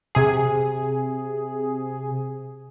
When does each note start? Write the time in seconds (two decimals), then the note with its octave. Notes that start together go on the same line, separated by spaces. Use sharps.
0.15 C3 G#4